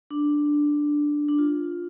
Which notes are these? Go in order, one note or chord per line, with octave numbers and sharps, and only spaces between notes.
D4
D4
F4